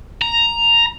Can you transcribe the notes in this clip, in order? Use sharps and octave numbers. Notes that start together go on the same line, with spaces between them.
A#5